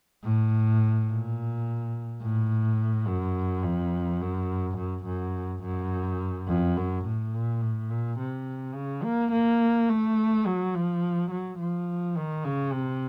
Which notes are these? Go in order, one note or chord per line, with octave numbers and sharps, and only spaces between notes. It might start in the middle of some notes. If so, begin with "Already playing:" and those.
A2
A#2
A2
F#2
F2
F#2
F#2
F#2
F#2
F2
F#2
A2
A#2
A2
A#2
C3
C#3
A#3
A#3
A3
F#3
F3
F#3
F3
D#3
C#3
C3